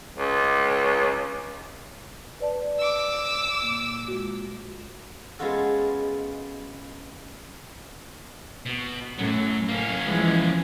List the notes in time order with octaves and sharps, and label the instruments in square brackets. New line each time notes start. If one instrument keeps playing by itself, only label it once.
[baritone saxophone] C#2
[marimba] B4 D5 A5
[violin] D6 E6
[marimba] A#2 A#3
G#3 F4 F#4
[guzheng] G#3 B3 C#4 F4 F#4 A4
[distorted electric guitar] B2
[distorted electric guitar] F#2 F#3 [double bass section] A2
[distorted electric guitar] A#3 C#4
[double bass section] E3 F3 G#3